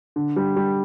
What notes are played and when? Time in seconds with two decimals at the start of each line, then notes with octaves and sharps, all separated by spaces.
0.16 D3
0.36 G3
0.56 G3